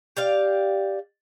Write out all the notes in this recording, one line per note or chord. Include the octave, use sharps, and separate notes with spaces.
G4 D5 F5